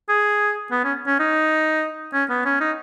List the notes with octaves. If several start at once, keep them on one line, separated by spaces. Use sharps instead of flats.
G#4
B3
C#4
C#4
D#4
C#4
B3
C#4
D#4